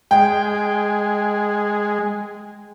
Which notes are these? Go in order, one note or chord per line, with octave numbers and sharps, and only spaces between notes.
G#3 G5